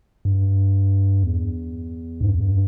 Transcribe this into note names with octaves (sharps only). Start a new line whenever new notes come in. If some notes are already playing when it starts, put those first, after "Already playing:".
G2
E2
G#2
G2
E2
G2